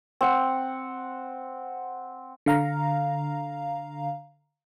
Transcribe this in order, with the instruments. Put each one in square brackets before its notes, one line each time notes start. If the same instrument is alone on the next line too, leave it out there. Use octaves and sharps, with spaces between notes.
[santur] C4 F#5
[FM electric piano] D3 F5 A#5